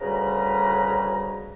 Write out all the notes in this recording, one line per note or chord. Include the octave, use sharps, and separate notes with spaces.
D2 C#3 G3 B4 A#5